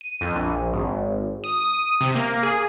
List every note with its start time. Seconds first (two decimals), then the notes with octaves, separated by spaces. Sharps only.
0.01 D#7
0.21 F2
0.36 A#1
0.73 G#1
1.44 D#6
2.01 C3
2.15 A#3
2.43 G#4